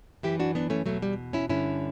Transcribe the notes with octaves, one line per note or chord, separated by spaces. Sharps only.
F#2 E3 E4 G4
D4 F#4
B3 D4
A3 C#4
E2 B2 F#3 A3
G3
C#4 E4
G2 D3 C#4 E4